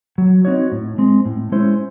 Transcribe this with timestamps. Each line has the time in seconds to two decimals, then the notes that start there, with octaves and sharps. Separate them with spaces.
0.18 F#3
0.45 C4 D#4 F#4 C#5
0.72 A2
0.98 G#3 C4
1.26 A2
1.52 G#3 C#4 E4 C5